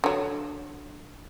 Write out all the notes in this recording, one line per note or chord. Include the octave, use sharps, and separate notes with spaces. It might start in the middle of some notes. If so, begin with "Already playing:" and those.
D3 F#3